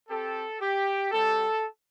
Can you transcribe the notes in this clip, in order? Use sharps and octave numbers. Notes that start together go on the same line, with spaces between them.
C4 G4 A4
G4
G3 C4 G4 A4